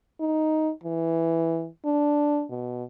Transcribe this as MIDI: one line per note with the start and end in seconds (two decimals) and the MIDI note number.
0.20 0.71 63
0.84 1.68 52
1.85 2.44 62
2.50 2.84 47